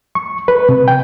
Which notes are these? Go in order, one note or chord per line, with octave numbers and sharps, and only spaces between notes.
C#6
B4
C3
G5